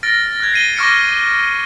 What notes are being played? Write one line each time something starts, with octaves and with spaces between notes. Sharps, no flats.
F6 A6 A#6 D7
F6 F#6 G#6
C7 D#7 G7
C#6 D6 F6 A#6 C#7 D7